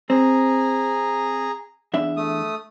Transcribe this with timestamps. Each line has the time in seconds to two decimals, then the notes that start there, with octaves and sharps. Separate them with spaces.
0.10 C4 G#4 A#5
1.93 E2 D4 E5
2.17 A3 D#6